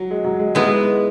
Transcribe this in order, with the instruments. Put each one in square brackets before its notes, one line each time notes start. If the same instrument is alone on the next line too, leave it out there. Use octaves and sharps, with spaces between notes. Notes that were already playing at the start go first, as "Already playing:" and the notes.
Already playing: [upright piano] F#3
G#3
F#3
G#3
[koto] G#3 B3 E4 [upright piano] D#4 F#4